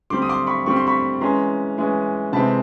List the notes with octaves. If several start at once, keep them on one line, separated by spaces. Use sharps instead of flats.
D3 G3 C4 C6 D6
D#6
C6 D6
B5 C#6
D3 G3 C4 C#6
C6
B5 C#6
E3 G#3 C#4 A#5 C6
E3 G#3 C#4
C3 E3 G#3 C4 A5 B5